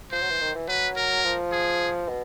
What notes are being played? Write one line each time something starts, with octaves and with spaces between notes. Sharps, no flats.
F3 C5
F#3
E3
D#3
E3
F#3 B4
A#4
F3
G#4
B2